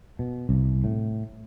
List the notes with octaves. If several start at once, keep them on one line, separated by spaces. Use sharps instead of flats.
B2
C2
A2